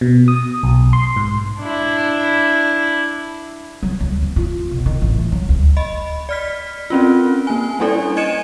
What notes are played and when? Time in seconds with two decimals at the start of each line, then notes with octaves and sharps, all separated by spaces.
0.01 B2
0.28 D#6
0.63 B1
0.93 C6
1.16 G#2
1.59 D4 E4
3.83 F#3
4.00 D2
4.23 D2
4.36 F4
4.71 B1
4.86 D#3
5.02 A1
5.13 A3
5.32 F#3
5.49 D2
5.77 D#5 B5
6.29 D5 F6 B6
6.90 C4 C#4 F4
7.47 A#3 G#5
7.80 G3 C#4 D4 E4 A4 D5
8.17 D#5 G#5 G#6 C#7 D#7 E7